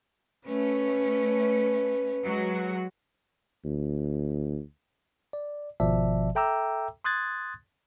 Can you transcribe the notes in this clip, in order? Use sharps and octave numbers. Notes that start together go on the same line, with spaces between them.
A3 C#4 B4
F#3 G#3 F#4
D2
D5
G#1 B2 F3 D5 E5 A5
A4 E5 G5 A#5 D6 E6
C6 D#6 F#6 G#6 A6